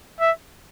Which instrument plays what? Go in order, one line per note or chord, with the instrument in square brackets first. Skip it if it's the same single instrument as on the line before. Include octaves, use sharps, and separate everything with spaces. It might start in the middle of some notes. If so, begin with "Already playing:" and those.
[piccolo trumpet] E5